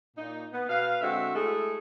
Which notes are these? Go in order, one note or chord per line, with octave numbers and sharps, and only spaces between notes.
A#2 D#4
B3
B2 B4 F5
D3 G#3 C4 F#4 E5
G#3 A3 E4 G#4 A4